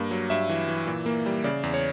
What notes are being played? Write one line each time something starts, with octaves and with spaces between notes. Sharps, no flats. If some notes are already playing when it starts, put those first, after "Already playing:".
Already playing: G2 A#3
F#3
G2 E5
E3
E3
A#2
A#3
G3
C#3 D5
E2
C#5